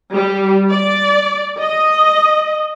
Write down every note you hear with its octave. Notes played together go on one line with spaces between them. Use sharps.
G3
D5
D#5